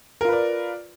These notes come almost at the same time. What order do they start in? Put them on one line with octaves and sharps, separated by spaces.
A#4 F4 B4 D5